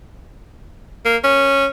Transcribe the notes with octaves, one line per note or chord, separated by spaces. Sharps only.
A#3
C#4